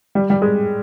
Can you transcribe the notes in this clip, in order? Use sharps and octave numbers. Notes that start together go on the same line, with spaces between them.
G3
G3
G#3